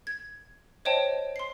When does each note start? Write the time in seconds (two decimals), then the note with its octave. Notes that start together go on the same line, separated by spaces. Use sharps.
0.07 G#6
0.85 C5 C#5 D#5 G5 A5
1.36 C6 C7